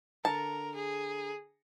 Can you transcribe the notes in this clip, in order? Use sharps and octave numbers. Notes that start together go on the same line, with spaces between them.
D3 A#4 A5 A#5 C#7
G#4